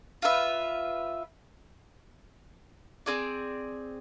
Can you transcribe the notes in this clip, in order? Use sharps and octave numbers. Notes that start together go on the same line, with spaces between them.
F4 B4 E5
C4 G#4 D5